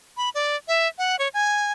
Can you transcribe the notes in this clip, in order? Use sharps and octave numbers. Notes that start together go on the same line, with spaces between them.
B5
D5
E5
F#5
C#5
G#5